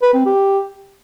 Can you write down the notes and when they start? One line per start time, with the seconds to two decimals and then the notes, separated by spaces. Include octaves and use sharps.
0.02 B4
0.14 C4
0.26 G4